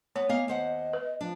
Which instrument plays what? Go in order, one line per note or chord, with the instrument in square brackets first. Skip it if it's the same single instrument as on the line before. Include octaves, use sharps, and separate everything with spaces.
[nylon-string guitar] B3 [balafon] C#5
[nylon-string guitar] A#3 D#5 F5 [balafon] B3
[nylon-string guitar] D#2 C5 F#5 [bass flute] D#5
[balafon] B4
[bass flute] F3 [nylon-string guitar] D4